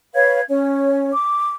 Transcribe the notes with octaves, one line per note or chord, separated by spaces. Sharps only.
B4 C#5 F5 G#6
C#4 C#5
D6